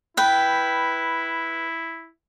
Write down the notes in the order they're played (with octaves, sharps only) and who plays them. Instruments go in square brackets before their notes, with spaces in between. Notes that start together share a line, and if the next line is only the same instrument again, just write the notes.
[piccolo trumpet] E4 [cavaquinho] B4 G5